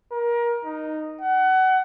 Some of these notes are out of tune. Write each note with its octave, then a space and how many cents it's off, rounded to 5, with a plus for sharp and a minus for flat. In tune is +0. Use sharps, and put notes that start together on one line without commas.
A#4 +25
D#4 -5
F#5 +25